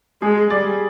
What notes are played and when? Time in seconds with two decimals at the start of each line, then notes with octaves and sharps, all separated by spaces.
0.22 G#3 G#4
0.50 G3 D5